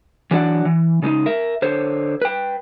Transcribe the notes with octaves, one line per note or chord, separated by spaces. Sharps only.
E3 F#3 D4 D5 F#5
E3
C#3 G#3 D4 D#4
A#4 E5
D3 C5 C#5
B4 G5